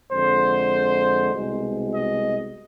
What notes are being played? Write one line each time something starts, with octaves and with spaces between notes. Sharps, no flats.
F2 D3 G#3 C5
C2 B2 G#3
D#5